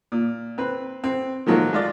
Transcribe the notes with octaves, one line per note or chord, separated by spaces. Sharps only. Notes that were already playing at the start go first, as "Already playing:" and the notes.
A#2
C4 B4
C4
D#3 F3 F#3 G#3 A#3
G#3 F4 D5